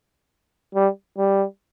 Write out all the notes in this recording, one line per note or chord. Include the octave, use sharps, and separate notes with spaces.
G3
G3